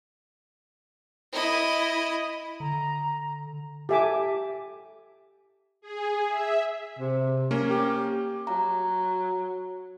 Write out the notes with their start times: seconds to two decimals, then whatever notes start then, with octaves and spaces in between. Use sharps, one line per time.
1.33 E4 D#5
2.60 D3 A#5
3.89 G4 A4 E5 G#5 D6
5.81 G#4
6.28 E5
6.99 C3
7.51 A#3 C#4
7.70 G4
8.47 F#3 A#5